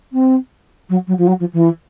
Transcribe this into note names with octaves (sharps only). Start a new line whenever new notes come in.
C4
F#3
F#3
F3
F#3
F3
E3